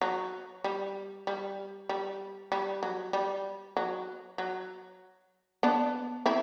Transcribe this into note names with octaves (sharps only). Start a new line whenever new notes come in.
F#3
G3
G3
G3
G3
F#3
G3
F#3
F#3
B3 D4
C4 E4